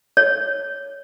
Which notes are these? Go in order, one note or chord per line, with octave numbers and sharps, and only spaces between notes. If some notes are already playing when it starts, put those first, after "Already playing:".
C#5